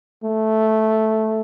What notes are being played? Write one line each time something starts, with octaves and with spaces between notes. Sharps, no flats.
A3